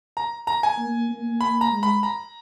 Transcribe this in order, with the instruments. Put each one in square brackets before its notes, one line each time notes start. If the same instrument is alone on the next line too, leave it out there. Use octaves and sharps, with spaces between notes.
[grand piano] A#5
A#5
G#5
[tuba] A#3
A#3
[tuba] A#3 [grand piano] B5
[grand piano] A#5
[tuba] G#3
[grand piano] B5
A#5